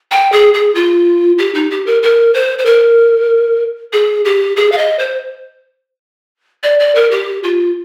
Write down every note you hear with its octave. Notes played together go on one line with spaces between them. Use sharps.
G5
G#4
G#4
F4
G4
D#4
G4
A#4
A#4
C5
C5
A#4
G#4
G4
G#4
F5
D#5
C5
D5
D5
A#4
G4
F4